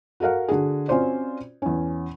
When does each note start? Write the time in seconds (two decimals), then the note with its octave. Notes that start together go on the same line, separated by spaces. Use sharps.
0.20 F#4 A4 A#4 F5 F#5
0.48 D3 F#4 G#4
0.88 C4 C#4 F4 F#4 C5 D5
1.62 E2 C#4